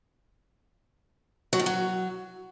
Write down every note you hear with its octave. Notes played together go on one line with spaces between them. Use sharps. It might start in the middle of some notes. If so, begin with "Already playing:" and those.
F#3
A2
F#3